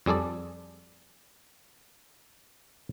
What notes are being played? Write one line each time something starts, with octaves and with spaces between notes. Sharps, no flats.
F2 G3 G#4 A4 D5